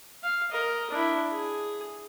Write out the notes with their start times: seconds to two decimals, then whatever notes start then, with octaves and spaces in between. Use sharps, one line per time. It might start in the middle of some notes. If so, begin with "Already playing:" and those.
0.23 F5
0.52 A#4 D#5
0.90 D4 E4
1.31 G#4